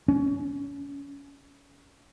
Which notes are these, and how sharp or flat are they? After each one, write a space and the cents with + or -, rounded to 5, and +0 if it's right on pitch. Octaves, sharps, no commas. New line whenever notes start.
C#4 +25